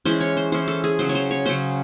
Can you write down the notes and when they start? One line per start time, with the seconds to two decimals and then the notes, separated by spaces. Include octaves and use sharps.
0.05 E3 G#3 C#4 C5
0.21 C#5
0.37 C5
0.52 E3 G#3 C#4 C5
0.68 A4
0.84 G#4
0.99 C#3 F#3 C#4 C5
1.09 C#5
1.15 C5
1.31 C#5
1.46 C#3 F#3 C#4 C5